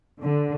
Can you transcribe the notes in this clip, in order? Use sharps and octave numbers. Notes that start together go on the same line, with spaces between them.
D3